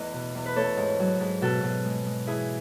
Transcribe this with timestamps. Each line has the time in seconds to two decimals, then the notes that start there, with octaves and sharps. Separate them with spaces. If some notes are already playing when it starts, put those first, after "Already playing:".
Already playing: E2 A3 B4 D#5
0.14 B2
0.35 E2
0.46 B4
0.56 A3 A4 C#5
0.77 G#2
0.99 F#3
1.20 G#2
1.41 B2 F#4 A4
1.63 B2
1.85 G#3
2.06 G#3
2.27 E3 E4 G#4